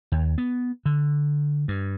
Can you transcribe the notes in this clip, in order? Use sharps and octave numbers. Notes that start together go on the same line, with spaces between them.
D#2
B3
D3
G2